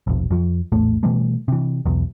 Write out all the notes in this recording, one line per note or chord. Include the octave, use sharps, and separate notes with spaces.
E1 A#1
F2 F3
A#1 E2 A2 A3
B2 E3 G3 A3
C3 E3
B1 E2